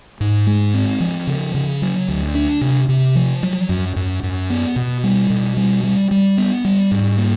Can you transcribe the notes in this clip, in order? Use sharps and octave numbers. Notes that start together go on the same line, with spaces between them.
G#2
G#3
C4
F3
C#3
C#3
F#3
D2
D4
C3
C3
F3
F#3
F#2
F#2
F#2
B3
B2
G3
B2
G3
G3
G3
B3
G3
G#2
A#3